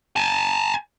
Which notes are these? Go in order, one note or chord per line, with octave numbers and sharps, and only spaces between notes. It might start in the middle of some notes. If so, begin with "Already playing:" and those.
G#5 A5